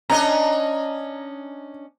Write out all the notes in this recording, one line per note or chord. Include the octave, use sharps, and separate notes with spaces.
C#4 D4 D#5 A#5